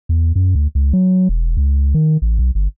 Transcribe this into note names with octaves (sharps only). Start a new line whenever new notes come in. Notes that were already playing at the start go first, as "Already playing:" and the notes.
E2
F#2
D2
C#2
F#3
E1
C#2
D#3
A1
B1
G1